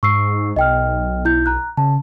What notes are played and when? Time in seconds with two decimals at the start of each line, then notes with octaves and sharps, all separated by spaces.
0.03 G#2 C#6 E6 C7
0.56 B1 D#5 G5 F6
1.25 E4 G6
1.46 A#5 F#6
1.77 C#3 A5